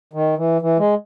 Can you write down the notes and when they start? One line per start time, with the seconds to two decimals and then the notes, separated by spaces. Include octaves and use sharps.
0.13 D#3
0.38 E3
0.62 E3
0.79 G#3